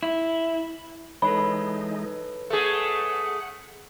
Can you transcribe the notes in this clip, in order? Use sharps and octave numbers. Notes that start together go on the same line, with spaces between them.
E4
E3 G#3 D#4 A4 B4 C#5 B5
A3 G#4 F#5